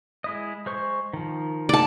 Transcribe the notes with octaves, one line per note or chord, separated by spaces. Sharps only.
G#3 E4 D#5
G#3 C5 C#6
D#3 F3
D5 A5